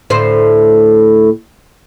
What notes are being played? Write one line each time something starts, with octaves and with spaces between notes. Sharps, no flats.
D2 A2 C5